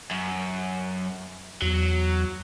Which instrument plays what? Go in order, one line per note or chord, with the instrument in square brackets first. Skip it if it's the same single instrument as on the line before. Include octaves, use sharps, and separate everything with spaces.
[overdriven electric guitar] F#2
[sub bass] E2 [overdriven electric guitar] F#3